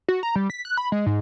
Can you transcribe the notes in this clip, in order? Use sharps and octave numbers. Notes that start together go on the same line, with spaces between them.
F#4
A#5
G3
B6
F#6
B5
G#3
G#2